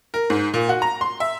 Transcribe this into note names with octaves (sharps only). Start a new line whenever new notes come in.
A#4
G#2
A#2
F#4
A#5
C6
E5